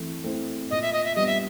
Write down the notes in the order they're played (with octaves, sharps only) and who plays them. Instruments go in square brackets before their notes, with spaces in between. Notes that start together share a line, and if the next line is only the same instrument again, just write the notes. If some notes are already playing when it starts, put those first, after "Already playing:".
Already playing: [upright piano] E3 A3 C4 E4
A3 C4 E4
[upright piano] A#2 [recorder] D#5
[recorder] E5
D#5
E5
[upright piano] G3 B3 D4 [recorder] D#5
[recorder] E5